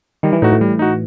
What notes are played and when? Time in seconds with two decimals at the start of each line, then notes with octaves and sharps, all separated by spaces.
0.23 D#3 G3
0.33 E3
0.42 A2 D#4 F#4
0.52 A2
0.61 G3
0.79 D#4 F#4